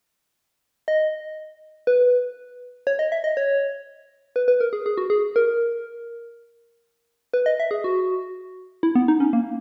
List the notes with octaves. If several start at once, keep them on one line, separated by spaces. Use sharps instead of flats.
D#5
B4
C#5
D#5
E5
D#5
C#5
B4
B4
A#4
G#4
G#4
F#4
G#4
A#4
B4
D#5
E5
G#4
F#4
E4
B3
D#4
C#4
A#3